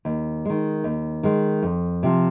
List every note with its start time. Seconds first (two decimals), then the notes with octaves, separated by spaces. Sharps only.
0.05 D#2
0.45 D#3 G#3
0.84 D#2
1.23 D#3 G#3
1.63 F2
2.03 C3 F3